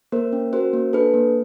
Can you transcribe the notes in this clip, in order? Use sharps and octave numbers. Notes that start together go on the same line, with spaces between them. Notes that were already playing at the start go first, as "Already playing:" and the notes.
A#3 A#4 C5
C#4
F#4 A#4 C5
A#3
D4 A4 B4
A#3